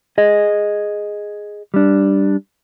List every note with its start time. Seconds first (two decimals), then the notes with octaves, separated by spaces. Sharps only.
0.18 G#4 D#5
1.74 G3 D4